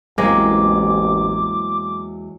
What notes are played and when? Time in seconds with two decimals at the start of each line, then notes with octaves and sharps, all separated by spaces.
0.18 A1 E2 F#3 G#3 A#3 C4 D6